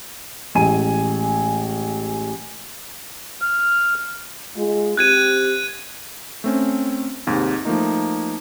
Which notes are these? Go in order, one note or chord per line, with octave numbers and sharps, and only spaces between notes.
A1 G#3 G#5 D#7
F6
G#3 F4
C4 G4 F#6 G#6 D#7
A3 C4 C#4
D#2 G#2 C3
F3 A3 A#3 D#4